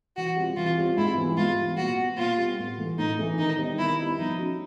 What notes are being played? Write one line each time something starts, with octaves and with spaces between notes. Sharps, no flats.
E3 F#4
G3 C4 F4
E3 F4
G3 C4 F4
G#2 E4
E3 G3 B3
G#2 F4
E3 G3 B3
A#2 F#4
G3 B3
A#2 F4
G3 B3
A2
E3 A3
A2 D#4
E3 A3
D#3 D#4
G3 B3 D#4
D#3 E4
G3 B3 D#4
F3 D#4
A3 C#4 F#4